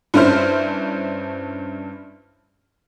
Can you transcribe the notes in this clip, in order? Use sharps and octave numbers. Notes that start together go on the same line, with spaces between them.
G2 C#4 D4 E4 C5 F6